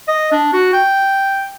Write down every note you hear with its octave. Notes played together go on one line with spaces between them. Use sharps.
D#5
D4
F#4
G5